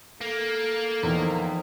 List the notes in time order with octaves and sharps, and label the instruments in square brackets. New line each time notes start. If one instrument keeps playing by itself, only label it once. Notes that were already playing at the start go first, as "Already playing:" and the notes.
[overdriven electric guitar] A#3 [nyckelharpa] A4
[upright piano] E2 [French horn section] D#3 F3